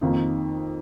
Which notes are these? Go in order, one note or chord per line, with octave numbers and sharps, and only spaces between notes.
F2 D#3 A#3 D#4